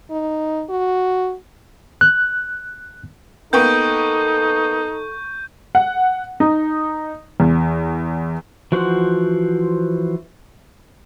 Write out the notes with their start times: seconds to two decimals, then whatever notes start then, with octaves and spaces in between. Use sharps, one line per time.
0.11 D#4
0.69 F#4
2.01 F#6
3.53 A#3 B3 D#4 A4 G5 C#6 G6
5.75 F#5
6.40 D#4
7.40 E2
8.72 E3 F3 F#4 C5 F#5